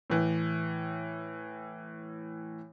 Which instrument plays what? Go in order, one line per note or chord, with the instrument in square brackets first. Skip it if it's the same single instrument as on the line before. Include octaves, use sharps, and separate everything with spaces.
[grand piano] A2 E3